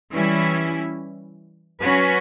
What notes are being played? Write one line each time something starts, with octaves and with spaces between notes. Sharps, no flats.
E3 G3 C#4 E4
F#3 C#4 F#4 B4